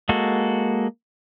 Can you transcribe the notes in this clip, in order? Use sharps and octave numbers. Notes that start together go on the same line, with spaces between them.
G#3 A#3 F#4 A4